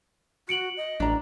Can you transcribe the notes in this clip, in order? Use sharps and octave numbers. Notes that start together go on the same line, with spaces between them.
F#4 C#7 D7 F#7
D#5
A1 D4 A#5